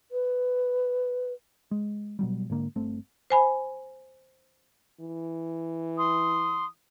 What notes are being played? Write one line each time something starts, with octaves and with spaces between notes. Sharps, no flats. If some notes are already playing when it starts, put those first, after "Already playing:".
B4
G#3
B2 F#3 G3
G#2 D3 A#3
G1 A3 C4
C5 G#5 B5
E3
C6 D#6